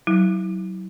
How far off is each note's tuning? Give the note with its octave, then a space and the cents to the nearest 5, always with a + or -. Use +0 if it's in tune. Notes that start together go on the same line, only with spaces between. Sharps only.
F#3 +25 E4 -25